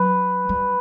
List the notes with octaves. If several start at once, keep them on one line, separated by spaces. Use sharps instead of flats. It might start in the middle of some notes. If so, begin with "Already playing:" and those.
Already playing: F#3 B4
G3